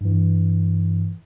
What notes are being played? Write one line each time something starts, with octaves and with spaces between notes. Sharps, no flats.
G2 E3